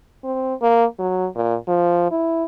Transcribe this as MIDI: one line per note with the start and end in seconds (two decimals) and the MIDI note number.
0.24 0.54 60
0.62 0.85 58
0.99 1.27 54
1.35 1.56 46
1.68 2.11 53
2.11 2.44 64